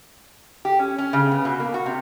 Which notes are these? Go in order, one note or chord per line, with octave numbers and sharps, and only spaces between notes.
G4
C#4
C#4
C#3
B3
B2
A#3
F#4
C3